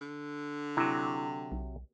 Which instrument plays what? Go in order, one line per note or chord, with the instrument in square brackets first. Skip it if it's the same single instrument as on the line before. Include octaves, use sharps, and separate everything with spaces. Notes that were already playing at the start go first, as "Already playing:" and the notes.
[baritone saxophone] D3
[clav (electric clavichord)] C3 F#3 [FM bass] E4
[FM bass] B1